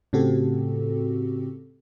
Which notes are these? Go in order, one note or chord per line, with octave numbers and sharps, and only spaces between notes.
A2 C#3 C4 F#4 G4 A4